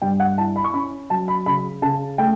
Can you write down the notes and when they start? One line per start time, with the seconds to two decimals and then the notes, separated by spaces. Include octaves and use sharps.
0.02 G2 G5
0.20 F#5
0.38 E4 A5
0.56 B5
0.64 C#6
0.74 C#4 B5
1.10 F#3 A5
1.28 B5
1.46 C#3 B5
1.82 C#3 A5
2.18 A3 G5